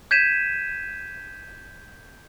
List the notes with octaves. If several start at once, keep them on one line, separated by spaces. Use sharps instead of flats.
G6 G#6 B6 D#7 E7